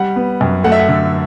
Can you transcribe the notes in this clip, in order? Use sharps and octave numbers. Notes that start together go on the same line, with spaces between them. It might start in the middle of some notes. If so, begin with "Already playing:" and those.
Already playing: G3 F#5
B3
F#2
A3 F#5
E5
F#5
D3